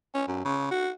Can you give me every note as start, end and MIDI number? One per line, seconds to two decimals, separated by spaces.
0.15 0.25 61
0.27 0.44 42
0.45 0.68 49
0.71 0.90 66